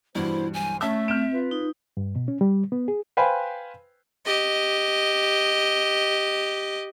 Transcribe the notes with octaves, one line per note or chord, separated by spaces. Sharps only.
G2 B2 E3 B3 E4 C5
C2 F#3 C5 G#5
A3 C#4 E5 A5 E6
C4 F6 G6 D7
F4 B4
D#4
G2
B2
C#4
G3
B3
G#4
B4 C5 F5 G5 G#5 B5
G4 D#5